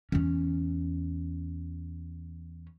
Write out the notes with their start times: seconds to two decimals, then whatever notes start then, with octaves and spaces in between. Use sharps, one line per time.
0.12 E2 C#4